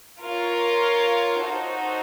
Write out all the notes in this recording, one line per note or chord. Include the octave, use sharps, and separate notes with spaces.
F4 A#4 C#5 F5
D#4 F#4 A4 C5